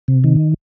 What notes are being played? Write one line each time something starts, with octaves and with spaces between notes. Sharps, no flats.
C3
D#3